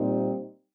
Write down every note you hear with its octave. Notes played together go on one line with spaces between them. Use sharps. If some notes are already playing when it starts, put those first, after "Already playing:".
Already playing: A#2 G3 C4 D#4